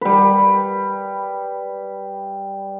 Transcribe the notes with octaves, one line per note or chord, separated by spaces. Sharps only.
G3 B4